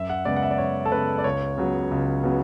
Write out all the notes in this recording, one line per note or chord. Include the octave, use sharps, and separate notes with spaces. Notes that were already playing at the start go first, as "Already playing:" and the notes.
Already playing: F#2 E5
F#5
C#3 G#3 B3 D5
F#5
E5
D5
F#2 C#5
A4
C#3 G#3 B3 B4
D5
C#2 C#5
C#3 F#3 B3
C#2
C#3 F#3 B3